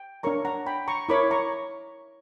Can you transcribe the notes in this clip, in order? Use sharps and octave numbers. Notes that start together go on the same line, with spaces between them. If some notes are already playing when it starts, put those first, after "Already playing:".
Already playing: G5
D4 A#4 C#5 A#5 C#6
F#5 A#5
G5 B5
A#5 C#6
E4 A#4 C#5 B5 D6
A#5 C#6